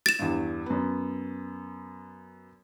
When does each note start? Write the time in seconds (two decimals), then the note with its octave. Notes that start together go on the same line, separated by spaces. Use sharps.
0.06 A6 E7
0.19 E2 G2
0.66 F#2 B3